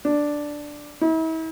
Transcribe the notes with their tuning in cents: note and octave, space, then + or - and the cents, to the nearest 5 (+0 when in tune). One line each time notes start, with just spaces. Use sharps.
D4 +0
E4 -40